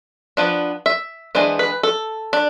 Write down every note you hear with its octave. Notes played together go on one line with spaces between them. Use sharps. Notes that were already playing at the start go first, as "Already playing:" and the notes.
F3 B3 D4
E5
E3 G#3 B3 D4 C5
B4
A4
D4